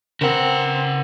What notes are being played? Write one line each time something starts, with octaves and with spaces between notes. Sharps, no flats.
C#3 C4 A#4 B4 F#5 G5